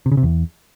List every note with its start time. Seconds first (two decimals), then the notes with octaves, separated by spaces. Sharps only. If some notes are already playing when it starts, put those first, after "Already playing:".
0.06 C3
0.12 C#3
0.17 C3
0.23 E2